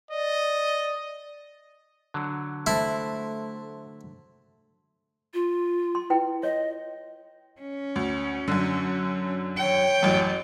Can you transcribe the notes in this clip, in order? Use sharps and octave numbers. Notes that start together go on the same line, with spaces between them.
D5 D#5
D3 F#3
A3 E4 C5 A5 C6
F4
C6
E4 B4 G5
C#5 D#5
C#4
D2
F#2 D3
C#5 G5
A1 F#2